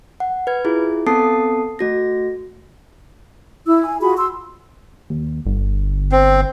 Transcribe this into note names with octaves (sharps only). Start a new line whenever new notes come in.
F#5
B4 G#6
E4 F4 G#4
B3 C4 A4 A5 D#6 C7
A3 F#4 A#6
E4 E6
G#5
F4 F#4 G#4 B5
C6 E6
D#2
G1
C4